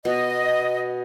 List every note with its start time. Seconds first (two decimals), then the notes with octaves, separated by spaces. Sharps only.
0.05 B2 D#5